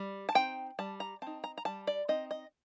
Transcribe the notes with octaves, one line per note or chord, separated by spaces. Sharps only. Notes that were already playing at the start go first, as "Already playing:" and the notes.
Already playing: G3
A5
C4 D#4 G5
G3 A5
A#5
C4 D#4 A5
A#5
A#5
G3 A5
D5
C4 D#4 D#5
D#5